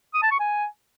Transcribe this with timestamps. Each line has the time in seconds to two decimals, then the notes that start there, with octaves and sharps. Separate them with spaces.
0.14 D#6
0.23 A5
0.31 C#6
0.40 G#5